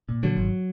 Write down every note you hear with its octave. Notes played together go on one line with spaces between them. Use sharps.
A#2
D3 F#3
G#1